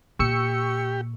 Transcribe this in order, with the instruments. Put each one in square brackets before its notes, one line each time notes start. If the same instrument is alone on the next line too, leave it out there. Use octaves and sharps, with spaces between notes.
[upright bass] A#2 [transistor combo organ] G4 [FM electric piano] C#6 E6 C#7